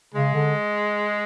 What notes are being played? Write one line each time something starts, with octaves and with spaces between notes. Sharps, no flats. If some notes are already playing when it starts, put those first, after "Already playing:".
C#3 G#3
D3